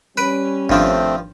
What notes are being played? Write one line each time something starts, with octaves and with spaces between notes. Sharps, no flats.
G3 C#4 B4 B5 D7 D#7
G#1 G2 F3 A3 C4 D4 C#5